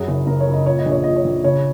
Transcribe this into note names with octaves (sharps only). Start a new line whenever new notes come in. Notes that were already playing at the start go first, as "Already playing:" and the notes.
Already playing: F#2 G#4
F#1
F#1 A#4
C#5
C#3
D#5
A#2 C#5
D#5
A#1
C#5
A#2 D#5
C#5
A#1
C#3 C#5